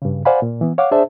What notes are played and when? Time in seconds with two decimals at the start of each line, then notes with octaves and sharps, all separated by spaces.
0.02 G2 C#3
0.25 C5 D5 F5 F#5 G#5 B5
0.42 A#2
0.61 E3 B3
0.78 C#5 F5 F#5 D6
0.91 D4 G#4 C5 D5 E5 A5